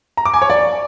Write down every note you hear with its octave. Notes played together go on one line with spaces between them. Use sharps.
A#5
D6
G#5
C#5
D5